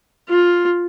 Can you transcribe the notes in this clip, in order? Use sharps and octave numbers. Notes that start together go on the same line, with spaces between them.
F4